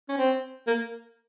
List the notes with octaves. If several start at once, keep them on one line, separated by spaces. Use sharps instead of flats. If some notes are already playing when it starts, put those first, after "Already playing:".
C#4
C4
A#3